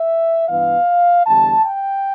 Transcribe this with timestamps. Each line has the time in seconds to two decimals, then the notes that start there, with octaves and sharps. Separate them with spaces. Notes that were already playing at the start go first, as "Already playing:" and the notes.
Already playing: E5
0.48 G2 E3 B3 F5
1.26 E2 D3 G3 A5
1.65 G5